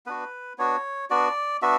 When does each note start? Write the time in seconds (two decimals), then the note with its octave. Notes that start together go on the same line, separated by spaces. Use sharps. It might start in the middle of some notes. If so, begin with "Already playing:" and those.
0.06 B3 D4 F#4 B4
0.58 B3 D4 F#4 C#5
1.10 B3 D4 F#4 D5
1.62 B3 D4 F#4 E5